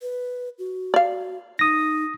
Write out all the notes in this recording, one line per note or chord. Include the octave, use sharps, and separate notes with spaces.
B4
F#4
D5 F5
D#4 D#6 A#6